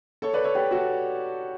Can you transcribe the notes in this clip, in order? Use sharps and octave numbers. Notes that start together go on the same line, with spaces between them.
A4 C#5
B4 D5
A4 C#5
G4 B4
F#4 A4